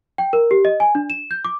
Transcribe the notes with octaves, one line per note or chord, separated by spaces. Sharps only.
G5
A#4
G4
D#5
G#5
D4
E7
G6
D6